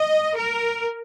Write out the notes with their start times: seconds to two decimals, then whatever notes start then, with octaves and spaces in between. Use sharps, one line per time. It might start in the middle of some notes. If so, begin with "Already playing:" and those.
Already playing: D#5
0.36 A#4